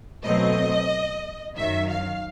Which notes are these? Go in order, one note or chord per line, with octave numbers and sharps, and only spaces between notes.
B2 F#3 A3 C4 D#5
F#2 D#3 F#3 E5
F5